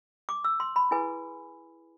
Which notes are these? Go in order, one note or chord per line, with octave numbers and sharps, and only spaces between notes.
D6
E6
C6
B5
E4 G#4 B4 G#5